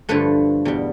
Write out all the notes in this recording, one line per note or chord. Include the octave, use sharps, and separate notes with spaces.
G2 D3 F3 A3 B4
E2 B2 G3